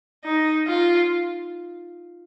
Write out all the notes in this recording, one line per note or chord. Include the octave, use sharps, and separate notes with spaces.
D#4
F4